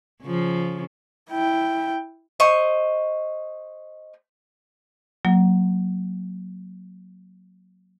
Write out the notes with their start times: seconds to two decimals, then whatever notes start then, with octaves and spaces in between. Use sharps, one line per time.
0.23 C#3 F3
1.30 E4 G5
2.40 C5 D#5 C#6
5.25 F#3 A#3